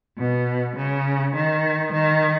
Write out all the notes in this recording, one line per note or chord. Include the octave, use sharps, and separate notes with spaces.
B2
C#3
D#3
D#3